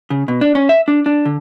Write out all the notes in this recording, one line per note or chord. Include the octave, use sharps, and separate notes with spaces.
C#3
B2
D4
C#4
E5
D4
D4
D3